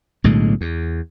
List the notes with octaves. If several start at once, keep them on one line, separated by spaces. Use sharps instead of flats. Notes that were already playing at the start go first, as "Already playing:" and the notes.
B1 A2 D3 G#3
E2